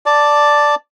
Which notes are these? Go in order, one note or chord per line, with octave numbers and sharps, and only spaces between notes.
D5 A5